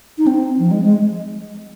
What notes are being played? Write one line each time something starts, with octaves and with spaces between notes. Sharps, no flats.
D#4
C4
F3
G#3
G#3